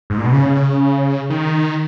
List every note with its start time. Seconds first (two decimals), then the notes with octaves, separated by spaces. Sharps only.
0.10 G#2
0.18 A#2
0.25 B2
0.32 C#3
1.30 D#3